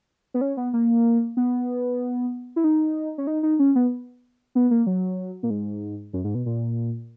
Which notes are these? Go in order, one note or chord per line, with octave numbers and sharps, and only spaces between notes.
B3
C#4
B3
A#3
B3
E4
D#4
C#4
D#4
D#4
C#4
B3
B3
A#3
F#3
A#2
G#2
F#2
G#2
B2
A#2